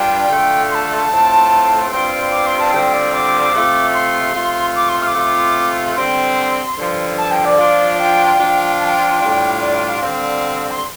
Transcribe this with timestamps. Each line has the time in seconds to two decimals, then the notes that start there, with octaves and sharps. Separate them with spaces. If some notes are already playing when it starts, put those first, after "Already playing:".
Already playing: G2 G3 D4 F4 G5
0.30 D3 A3 F4
0.70 C6
0.75 A5
1.11 A2 A3 C4 F4
1.92 G2 G3 C4 F4 C6
2.32 D6
2.46 C6
2.59 A5
2.72 D3 G3 C4 F4 G5
2.93 D5
3.13 D6
3.53 C3 A3 F4
3.94 C6
4.35 C3 A3 F4
4.75 D6
4.88 C6
5.02 F6
5.06 D6
5.15 C3 A3 F4
5.96 D3 G3 C4 C6
6.77 G2 D3 F3
7.18 A5
7.31 G5
7.45 D5
7.59 F3 D4 F4
7.98 G5
8.39 F3 D4 F4
8.80 A5
8.85 G5
9.20 A2 G3 D4 F4
9.60 D5
9.74 F5
9.87 F5
10.01 D3 G3 C4 F5
10.70 C6